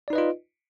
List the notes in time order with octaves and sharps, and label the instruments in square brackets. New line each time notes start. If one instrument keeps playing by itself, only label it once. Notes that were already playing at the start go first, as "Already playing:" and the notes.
[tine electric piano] D5
D#4
B4
D#5
F4